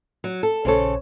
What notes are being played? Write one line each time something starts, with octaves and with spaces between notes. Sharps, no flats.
F#3
A4
A#1 C#3 A4 C5 C#5